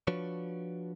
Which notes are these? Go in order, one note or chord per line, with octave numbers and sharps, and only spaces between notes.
F3 D4 F#4 B4 C#5